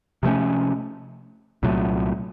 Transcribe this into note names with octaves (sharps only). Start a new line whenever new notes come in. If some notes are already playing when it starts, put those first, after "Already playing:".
C3 F3 A3 C#4
C2 A#2 F#3 A3